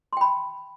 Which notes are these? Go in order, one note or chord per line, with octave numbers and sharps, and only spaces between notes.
G5 B5 C6